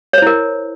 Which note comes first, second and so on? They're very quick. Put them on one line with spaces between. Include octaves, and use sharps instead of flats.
C#5 C5 E4 A#4